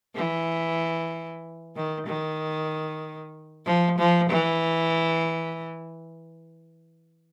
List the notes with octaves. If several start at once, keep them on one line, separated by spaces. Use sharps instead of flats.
E3
D#3
D#3
F3
F3
E3